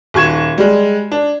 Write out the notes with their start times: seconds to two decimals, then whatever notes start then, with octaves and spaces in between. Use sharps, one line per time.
0.14 D#1 F#4 C#6 G#6 E7
0.58 G3 G#3
1.12 D4